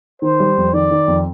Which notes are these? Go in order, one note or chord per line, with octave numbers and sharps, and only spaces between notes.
D#3 C5
G3
F2
D#3 D5
D#3
F2